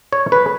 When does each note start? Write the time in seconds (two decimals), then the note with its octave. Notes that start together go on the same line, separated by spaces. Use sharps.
0.13 C#5
0.32 B4